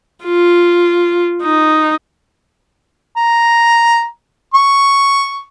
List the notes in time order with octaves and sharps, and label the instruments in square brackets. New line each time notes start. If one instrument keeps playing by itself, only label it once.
[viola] F4
D#4
[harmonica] A#5
C#6